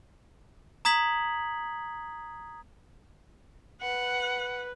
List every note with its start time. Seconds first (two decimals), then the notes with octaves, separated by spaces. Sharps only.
0.85 A#5 D#6 G#6 B6 F#7
3.82 B4 F#5